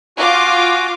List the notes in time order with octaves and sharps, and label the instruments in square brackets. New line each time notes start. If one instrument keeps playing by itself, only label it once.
[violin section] F4 D6 [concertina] F#4 G#5